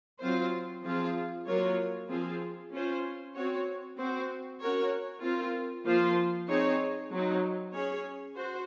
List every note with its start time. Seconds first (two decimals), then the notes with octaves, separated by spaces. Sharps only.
0.21 F#3 C4 F4 C5
0.83 F3 C4 F4 G#4
1.46 F#3 A#3 F4 A#4 C#5
2.09 F3 C4 F4 G#4
2.71 C#4 F4 C5
3.34 C4 F#4 C#5
3.97 C4 F#4 C5
4.60 C#4 F#4 A#4 C#5
5.22 C4 F4 A#4
5.85 F3 A#3 F4 C5
6.48 C4 D#4 G#4 C#5
7.11 F#3 C4 D#4
7.73 C#4 G#4 C#5
8.36 F#4 C5